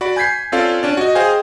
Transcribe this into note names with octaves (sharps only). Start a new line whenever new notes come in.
F#4 D5 B5
G#5 G6 G#6 B6 C7
C4 C#4 F4 A4 D5 F5
C#4 D4 D5
F#4 D#5
G#4 C5 D#5 F5 G5 G#5